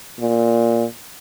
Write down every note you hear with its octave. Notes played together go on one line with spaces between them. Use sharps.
A#2